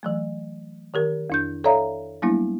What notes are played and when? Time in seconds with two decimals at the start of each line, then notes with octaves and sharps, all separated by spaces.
0.03 E3 F#3 A3
0.94 D#3 G4 A#4
1.30 F2 D4 G6
1.64 A4 C#5 D5 E5 F5 A#5
2.22 F#3 G3 A#3 B3 D4 E4